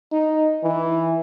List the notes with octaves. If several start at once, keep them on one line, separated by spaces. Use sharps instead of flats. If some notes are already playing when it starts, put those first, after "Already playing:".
D#4
E3